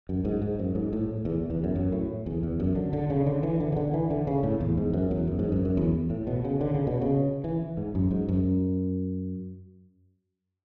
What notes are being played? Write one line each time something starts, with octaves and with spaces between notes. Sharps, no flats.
F#2
G#2
G#2
F#2
G#2
A2
E2
E2
F#2
F#2
A2
E2
E2
F#2
D3
D3
C#3
D3
E3
D3
C#3
D3
E3
D3
C#3
A2
E2
G#2
F#2
E2
F#2
G#2
F#2
F#2
E2
A2
B2
C#3
D3
C#3
B2
C#3
E3
G#2
F#2
G#2
F#2